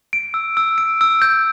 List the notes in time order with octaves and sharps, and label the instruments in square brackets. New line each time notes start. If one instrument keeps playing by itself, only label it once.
[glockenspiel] D7
E6
E6
D7
E6
G6